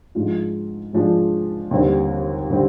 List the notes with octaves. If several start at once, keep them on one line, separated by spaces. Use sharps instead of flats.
G#2 F3 G#3 D4 F4
G#2 F3 G#3 D4 F4
D#2 D3 G3 C4
D3 G3 C4